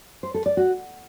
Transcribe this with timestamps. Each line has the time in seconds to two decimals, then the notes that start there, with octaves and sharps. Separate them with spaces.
0.23 C5
0.34 A4
0.46 D5
0.57 F#4